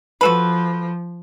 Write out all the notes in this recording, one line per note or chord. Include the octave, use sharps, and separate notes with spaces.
F3 F#4 A4 B4